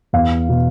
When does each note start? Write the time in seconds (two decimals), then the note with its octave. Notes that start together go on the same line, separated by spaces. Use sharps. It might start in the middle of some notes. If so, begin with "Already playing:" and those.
0.13 E2 F5
0.49 B2